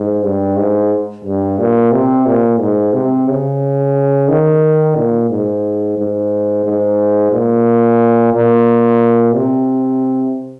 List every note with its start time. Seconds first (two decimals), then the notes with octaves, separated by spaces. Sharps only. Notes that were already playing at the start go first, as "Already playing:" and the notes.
Already playing: G#2
0.24 G2
0.57 G#2
1.25 G2
1.59 A#2
1.92 C3
2.26 A#2
2.60 G#2
2.93 C3
3.28 C#3
4.29 D#3
4.96 A#2
5.30 G#2
5.97 G#2
6.65 G#2
7.32 A#2
8.34 A#2
9.35 C3